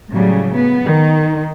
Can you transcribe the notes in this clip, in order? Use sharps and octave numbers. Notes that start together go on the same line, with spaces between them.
A2 C#3 F#3 G3
B3
D#3